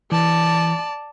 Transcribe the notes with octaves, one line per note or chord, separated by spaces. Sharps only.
E3 D5 A5